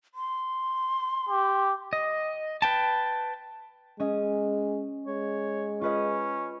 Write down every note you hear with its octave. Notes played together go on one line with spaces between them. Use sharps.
C6
G4
D#5
B4 G5 A5
G#3 C#4 D#5
G#3 C#5
C#4 F4 B4 D#5